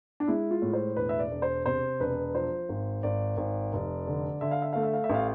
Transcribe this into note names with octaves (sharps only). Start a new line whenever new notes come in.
D4
G#3 E4
F4
A2
C5
E1 B4
E5
D5
E1
C5
C3 C5
E1 B4
F3 C5
G#1
G#1 D5
G#1
F1
D3
D3 E5
F5
E5
A3 F5
E5
F5
E5
A1 F5